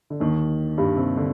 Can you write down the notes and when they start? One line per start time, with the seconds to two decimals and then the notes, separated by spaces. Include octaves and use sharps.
0.10 D3
0.20 D#2 D#3
0.78 G2 G3
0.97 C3
1.17 D3